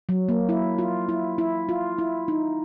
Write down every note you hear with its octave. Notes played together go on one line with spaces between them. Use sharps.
F#3
A#3
E4
F4
E4
E4
F4
E4
D#4